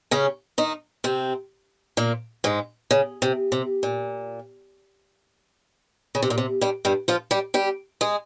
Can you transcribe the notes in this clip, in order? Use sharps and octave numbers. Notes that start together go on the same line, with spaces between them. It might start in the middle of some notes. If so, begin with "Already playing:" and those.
C#3 C#4
D#3 D#4
C3 C4
A#2 A#3
G#2 G#3
C#3
C3
C3
A#2
C#3
C3
A#2
C3
G2 G3
G2 G3
F3 F4
G3 G4
G3 G4
G#3 G#4